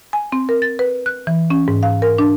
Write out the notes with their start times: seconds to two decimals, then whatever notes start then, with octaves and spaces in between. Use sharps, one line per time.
0.13 G#5
0.32 C4
0.49 A#4
0.62 A6
0.79 B4
1.06 F#6
1.27 E3
1.50 C#4
1.68 G#2
1.83 F5
2.02 A#4
2.18 D4